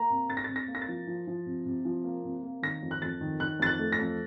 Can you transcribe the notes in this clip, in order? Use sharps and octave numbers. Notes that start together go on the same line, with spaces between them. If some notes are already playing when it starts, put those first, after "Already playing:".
Already playing: A#3 A#5
C3
C3 A6
A#6
C3 A6
A#6
A#3
A#6
A6
F3
F3
F3
C3
C3
F3
A#3
C3
A#3
D#3 A#6
F2
F#6
F2 A6
D#3
D#3 F#6
F2 A6
F#6
A3
A#6
F2